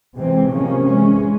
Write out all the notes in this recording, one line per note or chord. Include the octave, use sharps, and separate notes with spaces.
C3 E3 G#3 C4
C3 F3 A#3 C#4
E3 G#3 C#4